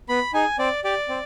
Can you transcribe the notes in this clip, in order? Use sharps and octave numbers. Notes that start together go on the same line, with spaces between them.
B3 B5
D#4 G#4 G#5
C4 D5
G4 D5
C4